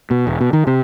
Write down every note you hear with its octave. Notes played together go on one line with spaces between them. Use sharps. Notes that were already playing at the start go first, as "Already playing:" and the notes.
B2
E1
B2
D#3
C3